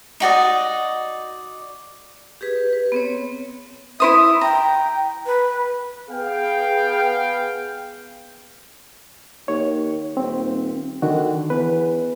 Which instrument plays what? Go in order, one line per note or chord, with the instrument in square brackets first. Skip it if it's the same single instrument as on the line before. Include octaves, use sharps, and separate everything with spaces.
[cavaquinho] D#4 F#4 D5 D#5
[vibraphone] G4 G#4 B4
B4
B3 C4 C#5
[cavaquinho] E4 C5 D#6 [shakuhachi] E5
[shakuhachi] G5 [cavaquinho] A#5
[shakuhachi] B4
[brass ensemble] B3 F5 G5 [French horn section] G#4
[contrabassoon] D#2 [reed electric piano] C#5
[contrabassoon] D#1 [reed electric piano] C4
[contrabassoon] D3 [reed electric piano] D#3 F#4
[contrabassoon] E2 [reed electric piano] B4